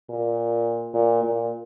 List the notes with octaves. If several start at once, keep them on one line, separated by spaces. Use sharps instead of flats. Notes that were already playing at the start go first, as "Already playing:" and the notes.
A#2
A#2
A#2